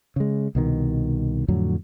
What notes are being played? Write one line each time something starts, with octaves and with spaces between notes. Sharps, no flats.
C#3 G#3
C2 B2 D#3
F2 A2 D3 F#3